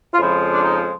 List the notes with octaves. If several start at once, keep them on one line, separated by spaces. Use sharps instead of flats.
F4
F2 C#3 F3 G#3 E4
D4
D#4